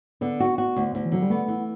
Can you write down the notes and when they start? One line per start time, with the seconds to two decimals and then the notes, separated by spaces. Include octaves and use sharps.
0.21 D3 B3
0.40 F#4
0.58 F#4
0.76 D2
0.95 D2
1.05 E3
1.12 D3 F#3
1.22 G3
1.30 A3 B3
1.48 E3